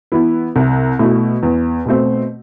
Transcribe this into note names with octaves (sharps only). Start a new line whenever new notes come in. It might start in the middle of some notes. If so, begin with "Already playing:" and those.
E3 B3 E4 B4
C2
B2 A3 E4
E2
B2 A3 C4